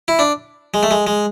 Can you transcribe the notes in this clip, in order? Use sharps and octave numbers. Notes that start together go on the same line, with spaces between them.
E4
D4
G#3
A3
G#3
G#3